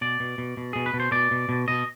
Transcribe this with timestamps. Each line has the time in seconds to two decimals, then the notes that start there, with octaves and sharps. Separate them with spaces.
0.01 B2 D5
0.20 B2
0.38 B2
0.57 B2
0.73 B2 G#4
0.86 B4
0.94 B2
1.00 C5
1.12 B2 D5
1.31 B2
1.49 B2
1.68 B2 D#5